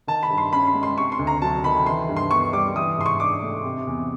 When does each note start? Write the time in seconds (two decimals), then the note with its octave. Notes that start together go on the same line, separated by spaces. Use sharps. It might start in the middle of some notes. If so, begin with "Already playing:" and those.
0.07 D#3 A5
0.23 B5
0.30 G2
0.38 C6
0.53 C#4 B5
0.67 C6
0.75 G#3
0.83 C6
0.98 C3 C#6
1.12 C6
1.19 D2
1.27 A#5
1.42 F#3 A5
1.64 D#3 B5
1.86 E3 C6
2.09 G2
2.17 C6
2.31 B3 C#6
2.53 G3 D6
2.76 E3 D#6
2.98 G#2 C6
3.06 C#6
3.20 D4 D6
3.42 A3
3.65 C3
3.87 E2